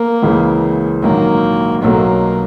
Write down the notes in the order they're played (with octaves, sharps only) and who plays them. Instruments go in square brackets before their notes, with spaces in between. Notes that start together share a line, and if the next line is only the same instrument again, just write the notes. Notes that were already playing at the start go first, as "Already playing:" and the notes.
Already playing: [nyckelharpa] A#3
[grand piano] C#2 C#3 E3
[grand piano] A#1 G#2 D#3 F#3 [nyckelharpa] A#3
[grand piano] B1 B2 F#3 A3 [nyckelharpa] A#3